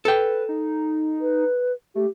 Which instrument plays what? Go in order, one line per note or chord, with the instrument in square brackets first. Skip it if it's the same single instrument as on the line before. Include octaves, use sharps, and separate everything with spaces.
[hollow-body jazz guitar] A4 G5 [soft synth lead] B4
[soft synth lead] D#4
[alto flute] B4
[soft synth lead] A3 [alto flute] G4